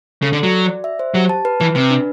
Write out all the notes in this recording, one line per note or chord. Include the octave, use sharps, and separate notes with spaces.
C#3 A4
D3
F#3 D5
F#4
D5
E5
C5
F#3 G4
A5
B4
E3 B4
C3 B4
D4